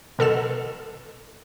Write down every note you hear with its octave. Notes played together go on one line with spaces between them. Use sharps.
B2 A4 C7 E7